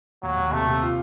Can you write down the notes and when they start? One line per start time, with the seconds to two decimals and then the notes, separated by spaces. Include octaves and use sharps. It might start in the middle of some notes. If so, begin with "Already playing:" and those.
0.23 D#2 F#3
0.37 D#2
0.51 C3 A3
0.67 C3
0.82 F4